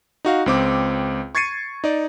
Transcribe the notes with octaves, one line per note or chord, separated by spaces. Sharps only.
D#4 F#4 F5
C#2 C4 D6
C#6 G#6 A6 C7 C#7 D#7
D#4 D5